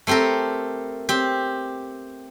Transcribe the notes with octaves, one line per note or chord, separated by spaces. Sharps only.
A3 C4 G4 A4 A#4
C4 G4